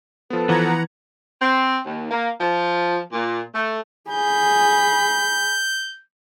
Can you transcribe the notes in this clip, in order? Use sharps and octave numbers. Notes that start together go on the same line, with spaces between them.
F3 B3 A4 B4
E3 F3 B3 F#5 A#5 G#6
C4
D#2
A#3
F3
A#2
A3
G#4 B5 G6